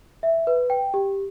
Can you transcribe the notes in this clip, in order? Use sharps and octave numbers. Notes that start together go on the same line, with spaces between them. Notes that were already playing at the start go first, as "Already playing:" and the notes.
E5
B4
G5
G4